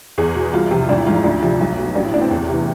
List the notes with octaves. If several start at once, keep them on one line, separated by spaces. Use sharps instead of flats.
E2 G#4
B2
C2 F4
C3 F3
G#1 D4
E4
G#2 F3 F4
E4
D2 D4
C3 F3
B1
B2
A1 D4
E4
A2 E3 C4 D4
E2 E4
C3 E3